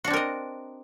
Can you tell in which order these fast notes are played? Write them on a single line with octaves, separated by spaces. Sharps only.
F#4 D4 C4 A#4 D#5